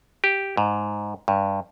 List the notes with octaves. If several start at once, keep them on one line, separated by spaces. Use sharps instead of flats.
G4
G#2
G2